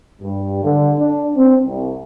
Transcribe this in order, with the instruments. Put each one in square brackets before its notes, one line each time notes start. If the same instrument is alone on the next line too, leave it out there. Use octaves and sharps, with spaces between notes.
[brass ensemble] G2
D3
D4
C4
C2